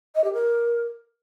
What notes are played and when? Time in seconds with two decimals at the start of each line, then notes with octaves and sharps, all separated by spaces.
0.15 D#5
0.24 G4
0.33 A#4